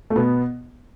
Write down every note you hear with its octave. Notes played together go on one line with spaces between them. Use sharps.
A3
B2 B3